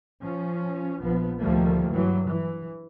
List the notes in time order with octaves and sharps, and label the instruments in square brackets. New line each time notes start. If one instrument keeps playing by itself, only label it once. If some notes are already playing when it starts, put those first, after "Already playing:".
[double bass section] F3 C#4
A#1 F3 B3
D2 D#3 F3 G3 A3 A#3
G2 E3 F#3
E3